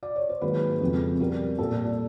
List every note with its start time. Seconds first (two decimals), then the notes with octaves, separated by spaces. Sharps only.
0.03 D5
0.16 C#5
0.29 C5
0.41 G#2 D#3 F#3 A#3 B4
0.81 F2 C#3 F3 G#3 B3
1.19 B2 G3 B3 A#4
1.59 A#2 G3 A#3 A4